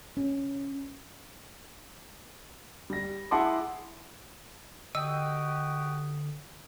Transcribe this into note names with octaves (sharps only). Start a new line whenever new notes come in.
C#4
G3 A#6
E4 G#4 F#5 A5 C6 D6
D3 F#4 G4 D#5 G5 D#6 E6